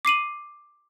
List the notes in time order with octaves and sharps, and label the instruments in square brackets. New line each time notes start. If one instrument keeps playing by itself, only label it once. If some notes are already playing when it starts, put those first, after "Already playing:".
[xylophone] D6 C7 D#7 F#7